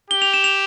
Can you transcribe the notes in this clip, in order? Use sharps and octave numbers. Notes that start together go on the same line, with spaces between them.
G4 G7
F7
E7
F7